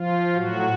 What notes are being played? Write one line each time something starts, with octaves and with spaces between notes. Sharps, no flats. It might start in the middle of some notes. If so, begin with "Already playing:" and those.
Already playing: F3 F4
A2 F#3 F#4